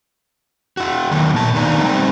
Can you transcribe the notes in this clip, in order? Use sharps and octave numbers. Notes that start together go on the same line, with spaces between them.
E4 F#4
D#3 E3 F#3 A#3
A#2 A5
D#3 A#3 B3 D4 D#4 A#5
G3 C4 D#4 E4